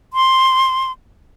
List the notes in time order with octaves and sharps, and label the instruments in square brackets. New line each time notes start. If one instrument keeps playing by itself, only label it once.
[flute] C6